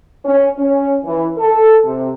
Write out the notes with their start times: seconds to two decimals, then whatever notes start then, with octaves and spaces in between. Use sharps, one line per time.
0.25 C#4
0.58 C#4
1.05 E3
1.38 A4
1.85 C3